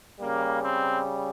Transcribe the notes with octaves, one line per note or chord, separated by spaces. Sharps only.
C#3 G3 A#3
C4